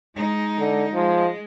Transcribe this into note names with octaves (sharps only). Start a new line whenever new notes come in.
G#3 D#4
D3
F3 G#3